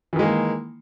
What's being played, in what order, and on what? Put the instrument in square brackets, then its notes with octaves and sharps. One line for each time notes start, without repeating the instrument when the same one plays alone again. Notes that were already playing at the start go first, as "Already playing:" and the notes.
[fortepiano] E3
D#3
G#3
A#3